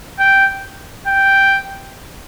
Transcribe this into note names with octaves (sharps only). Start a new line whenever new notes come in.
G5
G5